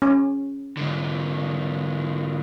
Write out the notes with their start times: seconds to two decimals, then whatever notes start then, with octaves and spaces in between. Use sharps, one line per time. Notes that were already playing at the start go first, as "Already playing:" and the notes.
0.02 C#4
0.77 G#2 D3